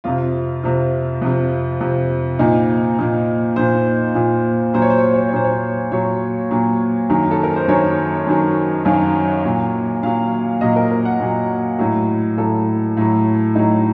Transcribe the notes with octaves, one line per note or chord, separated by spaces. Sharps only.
F2 C3 F3 F4
F2 C3 F3
F2 C3 F3
F2 C3 F3
A#2 F3 D#4
A#2 F3
A#2 F3 C5
A#2 F3
A#2 F#3 C5
C#5
C5
C#5
C5
C#5
C5
C#5
A#2 F#3 C5
C#5
C5
A#2 F#3 C#5
A#2 F#3
F#2 D#3 F#3
A4
A#4
C5
F#2 D#3 F#3 C#5
F#2 D#3 F#3
F#2 D#3 F#3 F5
A#2 F#3
A#2 F#3 F5
A#2 F#3 D#5
A#4
A#4
F#5
A#2 F#3
A2 F#3
A2 F#3 A4
A2 F#3
A2 F#3 D#4